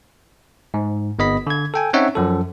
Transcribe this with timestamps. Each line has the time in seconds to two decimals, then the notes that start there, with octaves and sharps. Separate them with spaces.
0.74 G#2
1.19 G1 B3 D#5 B5 B6
1.47 D3 G#6
1.74 A4 G5 G#5
1.93 C4 C#4 D#4 C#5 E5 F#5
2.15 F#2 F3 A4